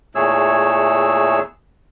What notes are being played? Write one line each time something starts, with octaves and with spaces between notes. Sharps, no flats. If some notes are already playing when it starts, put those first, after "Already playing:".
E2 A#2 A3 G#4 C#5 E6